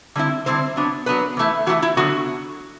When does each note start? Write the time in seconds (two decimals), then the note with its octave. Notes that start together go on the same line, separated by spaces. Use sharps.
0.15 D3 G3 C4 E4
0.46 D3 G3 C4 E4 C5
0.76 F#3 B3 D4
1.06 F#3 B3 D4 B4
1.37 E3 A3 E4
1.66 E3 A3 E4 F#4
1.82 E4
1.97 D3 F#3 B3 F#4